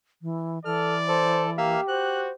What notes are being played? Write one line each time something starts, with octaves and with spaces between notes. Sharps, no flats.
E3
E3 A4 D5 F6
A4 C5
A#3 G4 E5 F5
F#4 C5 F#6